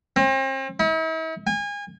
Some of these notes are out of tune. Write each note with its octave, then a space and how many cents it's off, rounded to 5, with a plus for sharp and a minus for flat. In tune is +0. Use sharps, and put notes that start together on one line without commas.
C4 +40
E4 -45
G#5 -30